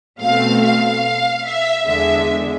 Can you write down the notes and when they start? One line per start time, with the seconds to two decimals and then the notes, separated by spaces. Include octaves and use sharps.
0.21 B2 A3 C4 F5
0.62 F5
1.46 E5
1.88 E2 D3 G#3 E5